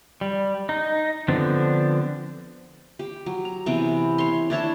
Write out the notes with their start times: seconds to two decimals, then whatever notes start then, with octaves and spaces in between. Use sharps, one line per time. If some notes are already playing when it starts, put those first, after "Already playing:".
0.21 G3
0.69 D#4
1.28 D3 F3 B3 C4 D4
2.99 G4
3.26 F#3
3.45 A#5
3.66 C3 E3 B3
4.18 C#5 C6
4.50 D4 E4 C#5 A5